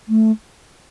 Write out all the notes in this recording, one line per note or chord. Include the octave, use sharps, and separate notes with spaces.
A3